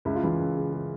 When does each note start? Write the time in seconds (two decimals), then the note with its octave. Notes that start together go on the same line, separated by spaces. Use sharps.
0.05 C#2 E4
0.16 F4
0.23 E3 E4
0.39 C#2
0.56 C#3
0.73 C#3